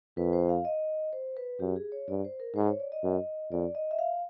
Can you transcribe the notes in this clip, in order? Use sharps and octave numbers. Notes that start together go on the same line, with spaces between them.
F2 B4
C5
F5
D#5
C5
B4
F#2 G4
G#4
C#5
G2 D5
C5
A#4
G#2 C5
C#5
D5
D#5
F#2
F2 D5
D#5
E5
F5